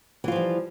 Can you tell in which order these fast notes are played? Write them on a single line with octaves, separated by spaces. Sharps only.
E3 F4 F3 G3